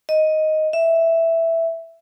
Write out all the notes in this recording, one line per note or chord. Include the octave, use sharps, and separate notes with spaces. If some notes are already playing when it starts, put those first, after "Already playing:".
D#5
E5